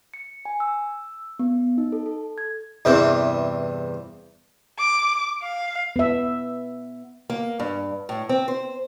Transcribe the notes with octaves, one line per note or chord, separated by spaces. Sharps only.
C#7
G#5
E6
B3
D#4
A4
A4
G#6
E2 G2 C3 E3
D6
F5
B3 E5
A#3
G2
A2
C4
C5